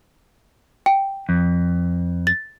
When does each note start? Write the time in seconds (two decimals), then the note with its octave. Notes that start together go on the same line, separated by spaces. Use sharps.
0.86 G5
1.29 F2
2.27 A6